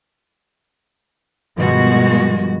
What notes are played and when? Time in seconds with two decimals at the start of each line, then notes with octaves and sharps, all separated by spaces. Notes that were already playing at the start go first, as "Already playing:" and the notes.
1.57 G2 B2 D#3 F3 G#3 F#4